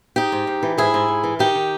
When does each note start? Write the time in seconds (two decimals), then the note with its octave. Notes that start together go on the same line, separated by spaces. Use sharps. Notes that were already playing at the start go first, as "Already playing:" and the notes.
0.16 G#2 D#4 G4
0.32 G#2
0.47 G#2
0.63 E3
0.78 G#2 E4 G#4
0.94 G#2
1.08 G#2
1.24 E3
1.39 D#3 D#4 G4
1.55 D#3